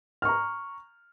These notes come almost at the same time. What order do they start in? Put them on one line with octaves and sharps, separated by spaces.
F6 C#6 A#5